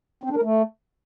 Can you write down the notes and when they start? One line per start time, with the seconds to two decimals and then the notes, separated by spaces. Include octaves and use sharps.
0.23 C4
0.30 D4
0.36 A#4
0.43 A3